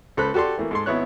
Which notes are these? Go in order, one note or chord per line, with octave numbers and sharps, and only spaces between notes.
C#2 A4 C5 B5 F#6
F#4 G4 A4 D5 C6
E3 A3 A#3
G#2 A4 C6
G#1 B3 E4 C#5 F#6